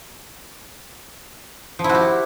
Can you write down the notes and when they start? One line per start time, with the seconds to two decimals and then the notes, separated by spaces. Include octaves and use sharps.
1.79 F3
1.84 E4
1.89 F#4
1.95 G4